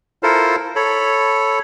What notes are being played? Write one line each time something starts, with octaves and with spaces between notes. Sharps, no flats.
E4 F4 A4 A#4 C5
A4 C#5 B5